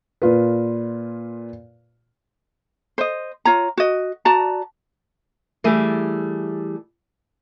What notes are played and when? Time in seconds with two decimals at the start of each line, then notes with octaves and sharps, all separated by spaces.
0.22 A#2 F4 B4
2.98 C5 D#5
3.45 F4 C#5 A#5
3.77 F#4 D#5
4.25 F#4 D5 A5 A#5
5.64 E3 G3 A3 G#4